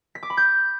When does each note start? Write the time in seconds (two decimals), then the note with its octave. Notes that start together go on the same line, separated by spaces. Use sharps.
0.15 B6
0.23 D6
0.30 B5
0.37 G6